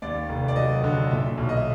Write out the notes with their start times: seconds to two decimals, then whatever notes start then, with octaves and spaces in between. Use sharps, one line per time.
0.02 D#2 D5
0.29 F1
0.48 D5
0.56 F#3 D#5
0.84 D3
1.11 A#2 E5
1.38 B1
1.49 D#5
1.57 E5